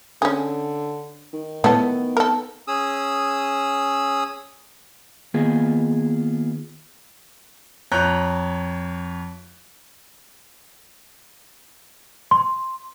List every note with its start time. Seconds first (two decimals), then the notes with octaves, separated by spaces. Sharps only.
0.22 D3 C#4 G#4
1.33 D#3
1.64 B3 E4 A4
2.17 A4 A#4
2.68 C#4 G#4 D#6 E6
5.34 D#3 A#3 B3 F4 G#4
7.92 F2 C#5 A#5 F#6 G6
12.31 C6